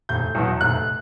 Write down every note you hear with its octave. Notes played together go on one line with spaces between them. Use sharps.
F1 G6
E2 B2 F#3
F1 F#6